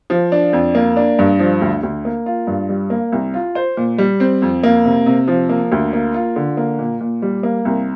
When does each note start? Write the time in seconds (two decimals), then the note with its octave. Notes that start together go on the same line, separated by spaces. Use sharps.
0.10 F3
0.32 D4
0.53 F2
0.75 A#3
0.96 D4
1.19 G2
1.39 F3
1.61 D2
1.83 D2
2.05 A#3
2.26 F4
2.47 G2
2.69 G3
2.90 A#3
3.12 C2
3.34 F4
3.55 C5
3.77 A#2
3.98 G3
4.20 C4
4.42 F2
4.63 A#3
4.85 C3
5.06 C3
5.28 F3
5.49 A#3
5.72 D2
5.93 A#3
6.14 F4
6.36 D3
6.57 A#3
6.79 A#2
7.01 A#2
7.22 G3
7.43 A#3
7.65 C2